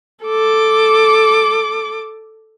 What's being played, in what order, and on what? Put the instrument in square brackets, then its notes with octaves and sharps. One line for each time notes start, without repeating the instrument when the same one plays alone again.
[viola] A4 D6